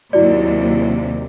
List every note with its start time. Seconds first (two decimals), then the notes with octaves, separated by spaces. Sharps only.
0.13 D#2 C3 F#3 E4 F#4 D5